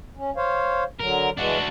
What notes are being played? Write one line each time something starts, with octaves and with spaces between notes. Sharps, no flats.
C#4
C5 C#5 F5
D3 F#3 A#4
E3 G#3 D4 F#4